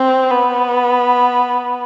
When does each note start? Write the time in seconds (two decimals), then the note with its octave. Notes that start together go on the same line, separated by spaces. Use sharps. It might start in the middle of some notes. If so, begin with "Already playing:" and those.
Already playing: C4
0.30 B3